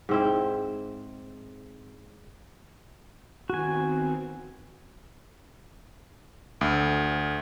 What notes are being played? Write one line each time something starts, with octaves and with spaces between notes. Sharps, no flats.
G#2 C4 E4
D#3 B3 C4 F#4 G#5
D2